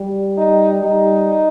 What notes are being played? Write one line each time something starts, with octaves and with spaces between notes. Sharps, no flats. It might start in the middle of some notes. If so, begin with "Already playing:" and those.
Already playing: G3
D#4
G3 D#4